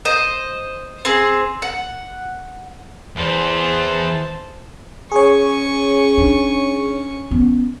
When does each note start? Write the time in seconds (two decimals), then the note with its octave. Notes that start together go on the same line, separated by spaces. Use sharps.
0.05 C5 D#5
1.05 C4 G#4
1.62 F#5
3.16 E2 E3 C5 A5
5.12 C#4 G#4 C#5 C#6
6.18 D4
7.31 B3 C#4